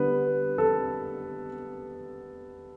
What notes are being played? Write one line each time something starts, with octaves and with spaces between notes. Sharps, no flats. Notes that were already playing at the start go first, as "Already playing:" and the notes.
Already playing: D3 G3 B3 B4
A4